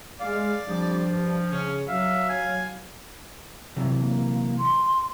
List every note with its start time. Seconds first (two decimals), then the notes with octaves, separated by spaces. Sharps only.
0.20 G#3 G#4 D5 F5
0.68 F2 F3 G3 D4
1.09 G2
1.50 C#3 C#4
1.88 F#3 E5 F5
2.29 G#5
3.76 C3 E3 F#3
3.99 A#3
4.58 C6